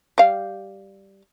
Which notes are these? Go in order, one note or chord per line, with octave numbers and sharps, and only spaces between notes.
G3 F5